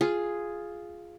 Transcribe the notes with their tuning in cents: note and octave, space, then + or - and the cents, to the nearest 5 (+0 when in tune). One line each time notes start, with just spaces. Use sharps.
F4 +0 G#4 +0